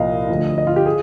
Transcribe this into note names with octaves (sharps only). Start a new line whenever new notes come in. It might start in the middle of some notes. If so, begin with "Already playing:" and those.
Already playing: C2 A#2 F3 D#5 F5
D2 D3 F3
D#5
F4
G4
G#4